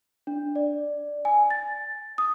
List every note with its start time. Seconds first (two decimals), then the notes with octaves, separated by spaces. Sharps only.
0.27 D4
0.56 D5
1.25 G#5
1.50 A6
2.18 D#6